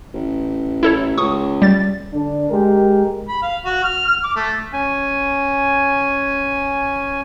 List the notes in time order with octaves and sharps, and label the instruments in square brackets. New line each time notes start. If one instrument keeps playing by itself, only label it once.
[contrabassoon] A1
[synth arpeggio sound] E4 A4 C#5
[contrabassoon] C#2 [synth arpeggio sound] C#6 D#6
[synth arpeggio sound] G3 A6
[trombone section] D3 D4
G#3 G4 A#4
[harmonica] B5
F5
F#4
F6
F6
D6
A3
[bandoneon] C#4 G#5